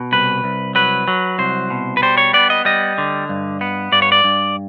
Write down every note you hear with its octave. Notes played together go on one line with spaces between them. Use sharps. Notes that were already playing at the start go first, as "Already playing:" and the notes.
Already playing: B2
C2 B4
C2
F#3 B4
F#3
C2 C5
B2
B4
G3 C5
C#5
B3 D5
D#5
G3 D#5
D3
G2
B3
G2 D5
C#5
D5
G2